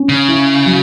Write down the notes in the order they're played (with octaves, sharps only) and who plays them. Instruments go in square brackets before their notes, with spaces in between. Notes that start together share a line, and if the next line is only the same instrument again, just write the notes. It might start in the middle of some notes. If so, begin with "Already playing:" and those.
Already playing: [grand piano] C#4
[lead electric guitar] C#3
[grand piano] E4
F#3